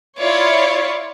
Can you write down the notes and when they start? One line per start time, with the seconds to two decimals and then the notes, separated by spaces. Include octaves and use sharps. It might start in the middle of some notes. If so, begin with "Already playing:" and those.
0.19 E4 F4 C#5 D5